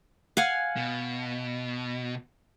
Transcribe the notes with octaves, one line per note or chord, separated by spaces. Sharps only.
F5 F#5 G#5
B2